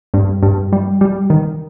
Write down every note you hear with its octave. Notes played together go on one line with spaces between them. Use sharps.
G2
G2
G3
G3
D#3